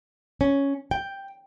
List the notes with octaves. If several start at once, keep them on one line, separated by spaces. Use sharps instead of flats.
C#4
G5